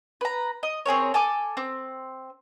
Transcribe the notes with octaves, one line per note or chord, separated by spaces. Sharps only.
B4 A#5
D#5
C4 G#4 A#4 C#5
A4 G#5 D6
C4